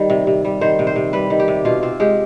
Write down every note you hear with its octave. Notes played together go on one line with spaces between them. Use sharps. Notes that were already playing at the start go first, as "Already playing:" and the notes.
Already playing: D#3 G3
C3
C3
G3
D#3 C5
C3
C5
C3
G3 B4
D#3
G4
C3
B2 F4
C4 F4
G#3 G4